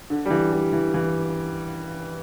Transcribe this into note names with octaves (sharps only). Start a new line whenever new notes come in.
D3
G3
E3
G3
E3
E3